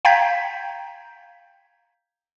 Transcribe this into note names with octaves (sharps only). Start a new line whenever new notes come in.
F5 G5 A#5 G6 G#6 B6